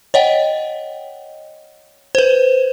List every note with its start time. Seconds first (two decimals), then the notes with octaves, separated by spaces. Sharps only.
0.14 C#5 D#5 F#5 G5
2.15 B4 C5